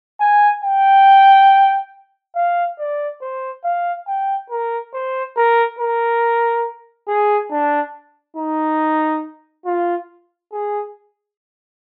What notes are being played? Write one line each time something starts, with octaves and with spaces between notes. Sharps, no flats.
G#5
G5
F5
D5
C5
F5
G5
A#4
C5
A#4
A#4
G#4
D4
D#4
F4
G#4